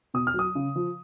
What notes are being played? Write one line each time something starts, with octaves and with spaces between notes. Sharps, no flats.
B2 D#6
F6
F#3 D#6
C#3
F3